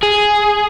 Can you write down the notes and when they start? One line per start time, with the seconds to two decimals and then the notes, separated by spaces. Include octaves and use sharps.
0.03 G#4